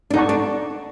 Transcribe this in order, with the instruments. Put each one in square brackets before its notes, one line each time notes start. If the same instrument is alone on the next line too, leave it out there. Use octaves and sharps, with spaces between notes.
[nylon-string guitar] D4
[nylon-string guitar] D#4 [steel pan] A4 D5 F#5 A5 C#6
[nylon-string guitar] D4